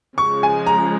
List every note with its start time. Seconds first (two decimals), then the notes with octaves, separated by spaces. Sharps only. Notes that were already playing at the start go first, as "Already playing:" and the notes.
0.18 C#3 F3 G#3 C#6
0.43 G#5
0.67 A#5